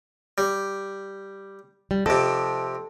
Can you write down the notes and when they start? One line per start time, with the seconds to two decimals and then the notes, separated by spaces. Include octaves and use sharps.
0.38 G3
1.91 G3
2.06 F2 C3 A4